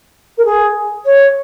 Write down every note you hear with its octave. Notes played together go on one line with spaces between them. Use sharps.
A#4
G#4
C#5